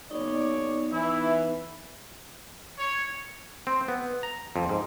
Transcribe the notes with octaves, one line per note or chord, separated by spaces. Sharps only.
F#1 B3 D#4 C#5 D5
E3 E4
C#5
C4
B3
A#5
F2
G#2